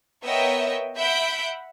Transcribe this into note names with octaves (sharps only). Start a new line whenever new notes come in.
B3 A#4 C#5 D#5 E5 G5
E5 F#5 B5 G6 B6 D7